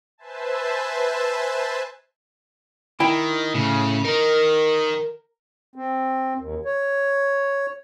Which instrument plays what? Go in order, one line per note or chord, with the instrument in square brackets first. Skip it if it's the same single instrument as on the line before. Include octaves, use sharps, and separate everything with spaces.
[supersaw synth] B4 C5 E5 G#5 A5
[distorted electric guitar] D#3 [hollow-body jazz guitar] E4 G5
[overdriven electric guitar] A2 [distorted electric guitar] C#3
[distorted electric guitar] D#3 D#4 [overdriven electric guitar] A#4
[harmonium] C4
D#2
C#5